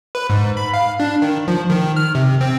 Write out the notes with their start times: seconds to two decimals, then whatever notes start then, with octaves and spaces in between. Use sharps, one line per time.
0.15 B4
0.30 G#2
0.57 B5
0.74 F5
1.00 D4
1.22 D#3
1.48 F3
1.70 D#3
1.96 F6
2.15 C3
2.41 C4